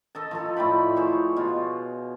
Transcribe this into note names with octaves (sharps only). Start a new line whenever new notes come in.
A4 D#5 A5
F3 D#4 A4
A2 D5 G5 B5
G#4 C5 C#5
B2 F4